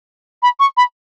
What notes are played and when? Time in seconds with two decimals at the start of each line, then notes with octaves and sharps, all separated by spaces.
0.43 B5
0.60 C#6
0.77 B5